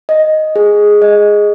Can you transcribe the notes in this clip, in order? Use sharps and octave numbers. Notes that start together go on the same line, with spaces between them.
D#5
G#4
D#5